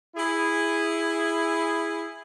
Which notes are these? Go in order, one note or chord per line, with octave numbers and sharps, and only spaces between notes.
E4 G#4